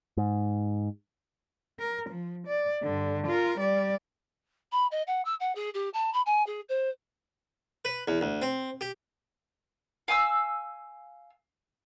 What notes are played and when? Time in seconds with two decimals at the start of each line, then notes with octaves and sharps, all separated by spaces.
0.17 G#2
1.80 A#4
2.09 F3
2.47 D5
2.83 G2 D3
3.27 F4 A#4
3.59 G3 D5
4.72 B5
4.91 D#5
5.07 F#5
5.25 E6
5.40 F#5
5.55 G#4
5.74 G4
5.94 A5
6.13 B5
6.26 G#5
6.46 G#4
6.69 C5
7.85 B4
8.08 E2
8.21 D2
8.42 C4
8.81 G4
10.08 F5 G#5 D#6 E6